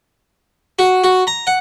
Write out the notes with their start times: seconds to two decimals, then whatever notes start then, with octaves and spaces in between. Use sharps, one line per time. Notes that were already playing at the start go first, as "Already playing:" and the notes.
0.79 F#4
1.04 F#4
1.27 A#5
1.47 F#5